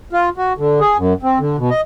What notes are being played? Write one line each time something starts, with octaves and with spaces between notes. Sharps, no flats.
F4
F#4
D3
G#4
F#2
C4
D3
B2
D#5